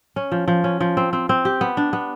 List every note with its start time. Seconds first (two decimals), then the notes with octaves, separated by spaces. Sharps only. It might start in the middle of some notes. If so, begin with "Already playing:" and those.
0.16 C#4
0.32 F3
0.48 F3
0.64 C#4
0.81 F3
0.97 C4
1.13 C4
1.29 C4
1.45 G4
1.61 B3
1.77 D4
1.93 B3